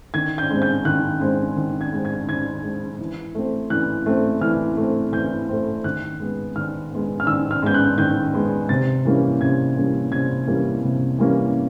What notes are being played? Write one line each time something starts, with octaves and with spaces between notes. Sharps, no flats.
D#3 G#6
G6
G#3 C4
G6
D#3 F#6
G#3 C4
D#3
G#6
G#3 C4
G#6
D#3 G#6
G#3 C4
E3
A3 C4
E3 F#6
A3 C4
E3 F6
A3 C4
E3 G6
A3 C4
D#3 F#6
G#3 B3
D#3 F6
G#3 B3
F6
D#3 E6
F6
G#3 B3 G6
F#6
D#3 G6
G#3 B3
C3 A6
E3 G3 A#3 C#4
C3 G#6
E3 G3 A#3 C#4
C3 G#6
E3 G3 A#3 C#4
C3
E3 G3 A#3 C#4